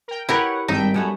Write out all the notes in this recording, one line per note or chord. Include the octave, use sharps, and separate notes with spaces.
A#4 G5
E4 G4 A#4 B4 C#5 F#5
G#1 G2 D#4 E5 G5
F#2 G3 B3 C#4 A4